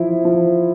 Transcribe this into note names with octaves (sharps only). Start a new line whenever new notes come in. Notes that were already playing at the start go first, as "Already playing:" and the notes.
Already playing: F3 E4
F3